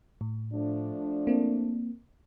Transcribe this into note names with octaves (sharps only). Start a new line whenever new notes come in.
A2
F3 A3 D4
A#3 C4